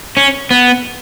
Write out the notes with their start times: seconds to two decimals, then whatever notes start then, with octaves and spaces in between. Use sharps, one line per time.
0.17 C#4
0.51 B3